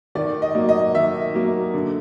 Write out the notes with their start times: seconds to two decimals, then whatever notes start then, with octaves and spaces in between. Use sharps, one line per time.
0.15 D#3 D5
0.42 D#5
0.55 F#3 A#3
0.69 D#5
0.94 D#3 E5
1.34 F#3 A#3
1.74 D3